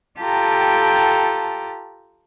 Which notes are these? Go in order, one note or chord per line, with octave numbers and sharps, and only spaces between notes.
F4 G4 A4 G5 A5 A#5